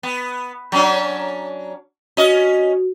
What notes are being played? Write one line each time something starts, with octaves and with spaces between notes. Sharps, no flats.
B3
F#3 C#4 D4
C#4 F#4 D#5